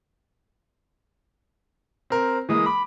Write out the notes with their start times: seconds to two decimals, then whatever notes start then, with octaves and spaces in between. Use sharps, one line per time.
2.10 C4 A#4 C5
2.49 E3 G#3 A#3 D#6
2.66 B5 D6